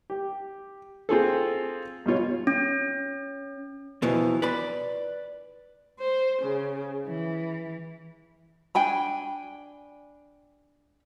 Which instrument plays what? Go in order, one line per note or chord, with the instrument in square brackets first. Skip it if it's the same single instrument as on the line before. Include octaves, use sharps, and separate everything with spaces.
[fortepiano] G4
C4 F4 G#4 A4
G2 B2 F4 C#5
[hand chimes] C#4
[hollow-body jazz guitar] E2 B2 E3 F3
B4 D5 B5
[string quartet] C5
C#3
E3
[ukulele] D4 G5 G#5 B5